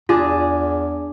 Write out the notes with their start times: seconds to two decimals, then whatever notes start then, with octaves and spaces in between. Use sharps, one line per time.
0.09 E2 D4 F4 G#4